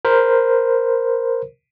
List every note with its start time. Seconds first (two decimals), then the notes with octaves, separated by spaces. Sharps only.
0.05 A#4 C5